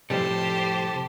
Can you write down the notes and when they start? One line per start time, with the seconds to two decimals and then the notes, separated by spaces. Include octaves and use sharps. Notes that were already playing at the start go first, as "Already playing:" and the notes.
0.10 F2 A2 C3 G3 G4 A4 C5 A5